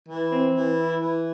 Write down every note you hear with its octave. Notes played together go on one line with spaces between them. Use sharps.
E3
C4
E3
E4
E3